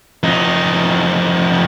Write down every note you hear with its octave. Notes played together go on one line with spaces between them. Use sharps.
F2 D#4